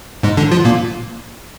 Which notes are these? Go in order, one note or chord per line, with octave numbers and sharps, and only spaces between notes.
G#2 G#3
D3 D4
F3 F4
A#2 A#3